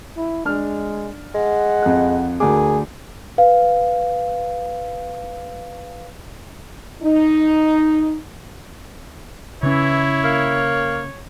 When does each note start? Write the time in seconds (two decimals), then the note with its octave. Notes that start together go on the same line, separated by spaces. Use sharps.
0.17 E4
0.45 G#3 D4 F6
1.35 G#3 F#5
1.82 F2 F#6
2.40 D2 G#4 A#4 D6
3.38 B4 F5
7.02 D#4
9.63 C#3 E3 C#4 E4 C#5
10.24 A#3